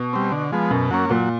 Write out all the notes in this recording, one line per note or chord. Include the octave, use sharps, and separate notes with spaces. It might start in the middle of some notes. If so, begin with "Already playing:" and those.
Already playing: B2
G3 C4
D3
F3 G#3 B3
F#2 B2
F#3 A#3 C#4
A#2 F#3